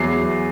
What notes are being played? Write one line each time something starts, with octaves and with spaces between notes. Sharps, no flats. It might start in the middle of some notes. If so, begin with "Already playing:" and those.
Already playing: E2 F#3 C7